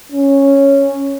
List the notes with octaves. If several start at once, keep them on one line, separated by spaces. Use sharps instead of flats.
C#4